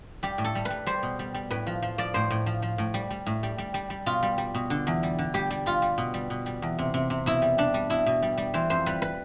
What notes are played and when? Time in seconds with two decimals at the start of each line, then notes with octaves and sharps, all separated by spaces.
0.23 G3 G4
0.38 A2
0.44 A4
0.55 G3
0.65 B4
0.70 G3
0.86 G3 C5
1.03 B2
1.19 G3
1.34 G3
1.51 A2 B4
1.67 F3
1.82 F3
1.98 F3 D5
2.14 A2 C5
2.30 A2
2.46 F3
2.62 F3
2.78 A2
2.94 G3
3.10 G3
3.26 A2
3.43 G3
3.58 G3
3.74 G3
3.90 G3
4.06 B2 F4
4.23 G3
4.38 G3
4.54 B2
4.70 D3
4.87 E2
5.03 G3
5.19 D3
5.34 G3 G4
5.51 G3
5.66 G3 F4
5.82 G3
5.98 B2
6.14 G3
6.30 B2
6.46 G3
6.62 E2
6.79 C3
6.94 C3
7.10 C3
7.26 B2 E4
7.42 G3
7.58 G3 D4
7.74 G3
7.90 B2 E4
8.06 B2
8.23 G3
8.38 G3
8.54 E3 C5
8.70 F2 C5
8.86 G3 B4
9.02 B4